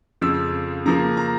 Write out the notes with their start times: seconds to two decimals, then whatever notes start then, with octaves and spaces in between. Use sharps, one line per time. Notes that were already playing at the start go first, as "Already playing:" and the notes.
0.21 F2 C#3 F3 E6
0.86 C#3 F3 A#3 A#5
1.17 A#5